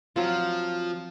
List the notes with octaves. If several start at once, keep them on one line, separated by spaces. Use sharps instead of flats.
F3 F#3 C4 F4